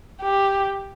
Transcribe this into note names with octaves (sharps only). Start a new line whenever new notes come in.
G4